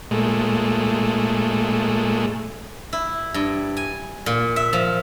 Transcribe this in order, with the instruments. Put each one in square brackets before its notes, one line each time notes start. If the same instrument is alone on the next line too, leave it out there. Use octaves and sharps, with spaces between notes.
[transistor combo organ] A#2 G#3 A3
[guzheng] E4
G2
G#5
A#2
E5
F3